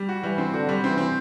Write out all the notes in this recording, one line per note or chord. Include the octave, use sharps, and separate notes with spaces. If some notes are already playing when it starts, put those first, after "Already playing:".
Already playing: G3
F#4
E3 G3
C4
D3 F#4
G3
E3 C4
C4